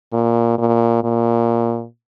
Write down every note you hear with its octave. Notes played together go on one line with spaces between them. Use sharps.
A#2
A#2
A#2